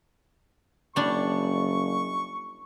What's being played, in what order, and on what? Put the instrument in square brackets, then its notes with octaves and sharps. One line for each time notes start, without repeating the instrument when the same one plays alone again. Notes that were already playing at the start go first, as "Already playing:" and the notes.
[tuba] F#1 [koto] G3 D4 [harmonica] C#6